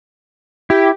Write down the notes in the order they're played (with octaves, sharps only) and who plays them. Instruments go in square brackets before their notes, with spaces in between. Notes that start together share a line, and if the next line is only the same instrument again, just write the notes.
[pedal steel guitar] E4 [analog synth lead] G4